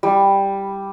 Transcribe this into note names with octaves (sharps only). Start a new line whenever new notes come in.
G3